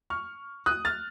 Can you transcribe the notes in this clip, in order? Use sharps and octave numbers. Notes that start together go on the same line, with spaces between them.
C#6 F6
D#6 F#6
F6 A6